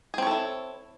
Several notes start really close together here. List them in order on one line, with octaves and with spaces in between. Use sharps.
G#4 C4 C#5 A4 E4